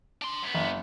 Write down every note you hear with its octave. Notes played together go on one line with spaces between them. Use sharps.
D4 C6
F#2 B3
F#1